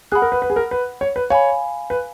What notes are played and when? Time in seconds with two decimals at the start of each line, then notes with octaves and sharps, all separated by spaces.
0.12 G#4 F#5 B5 D#6 F#6
0.22 A#4
0.32 B4
0.42 B4
0.50 G#4
0.56 A#4
0.71 B4
1.01 C#5
1.16 B4
1.30 C#5 F5 G#5 B5
1.90 B4